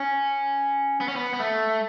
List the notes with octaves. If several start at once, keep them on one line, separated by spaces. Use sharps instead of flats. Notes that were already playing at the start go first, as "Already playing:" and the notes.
Already playing: C#4
B3
C#4
B3
B3
A3